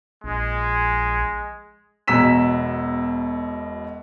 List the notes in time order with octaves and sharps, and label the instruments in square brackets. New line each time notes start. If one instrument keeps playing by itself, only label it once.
[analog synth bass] A#1 [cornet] G#3
[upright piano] E1 B2 A#5 E6 B6 E7